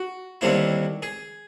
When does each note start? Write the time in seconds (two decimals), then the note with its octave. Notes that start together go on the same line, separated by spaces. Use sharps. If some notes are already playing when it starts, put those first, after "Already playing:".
Already playing: F#4
0.41 D#2 D3 G3 C4 E4
1.02 G#4